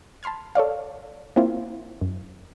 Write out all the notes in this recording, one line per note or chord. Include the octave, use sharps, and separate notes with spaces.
A5 B5 C6 F6 G#6
A4 C#5 D5 F5
A#3 C4 E4 F4
F#2